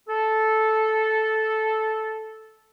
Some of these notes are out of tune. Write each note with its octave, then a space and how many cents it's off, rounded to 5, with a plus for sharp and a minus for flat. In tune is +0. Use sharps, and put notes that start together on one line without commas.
A4 -10